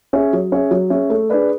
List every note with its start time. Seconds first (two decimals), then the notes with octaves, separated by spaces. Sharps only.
0.13 C#4 G#4 C#5 E5
0.33 F#3
0.52 C#4 G#4 C#5 E5
0.71 F#3
0.90 C#4 G#4 C#5 E5
1.10 A3
1.30 D4 G#4 B4 D5